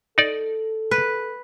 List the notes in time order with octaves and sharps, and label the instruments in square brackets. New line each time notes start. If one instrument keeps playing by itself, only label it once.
[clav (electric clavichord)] D#4 D5 [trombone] A4
[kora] B4